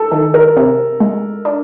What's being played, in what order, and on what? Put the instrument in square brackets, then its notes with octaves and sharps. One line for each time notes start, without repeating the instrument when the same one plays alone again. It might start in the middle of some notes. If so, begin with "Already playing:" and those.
Already playing: [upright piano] A4
[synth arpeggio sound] D#3 [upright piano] A4
[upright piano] A#4
[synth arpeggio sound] C3
G#3
D4